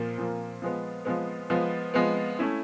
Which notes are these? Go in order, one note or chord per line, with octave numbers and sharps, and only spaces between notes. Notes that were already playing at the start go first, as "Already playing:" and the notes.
Already playing: A#2 F3 A#3
A#2 F3 A#3
F3 G#3 B3
F3 G#3 B3
F3 G#3 B3
F3 G#3 B3
A3 C#4 E4